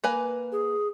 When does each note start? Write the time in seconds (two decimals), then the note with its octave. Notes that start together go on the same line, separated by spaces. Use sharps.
0.04 A#3 B4 G#5
0.52 G#4